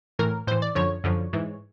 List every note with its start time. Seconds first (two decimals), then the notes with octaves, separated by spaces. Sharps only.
0.19 A2 E3 A#4
0.47 A2 E3 C5
0.62 D5
0.75 F#2 D3 F3 C#5
1.04 F#2 D3 F3
1.33 G#2 E3